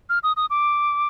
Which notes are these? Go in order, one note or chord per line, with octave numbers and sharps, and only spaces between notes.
F6
D#6
D#6
D6